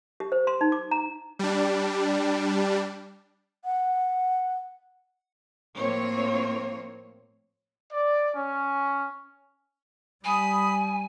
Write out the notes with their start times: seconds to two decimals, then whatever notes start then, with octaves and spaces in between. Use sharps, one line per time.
0.20 G4
0.32 C5
0.47 C6
0.61 D#4
0.72 D6
0.91 A#5
1.39 G3 D4
3.65 F#5
5.77 A2 F3 A#3 C4 C#5
7.92 D5
8.34 C#4
10.25 G3 G#5 B5 D#6